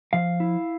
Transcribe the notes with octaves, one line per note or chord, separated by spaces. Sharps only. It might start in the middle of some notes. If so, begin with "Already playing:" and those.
F3 F5
E4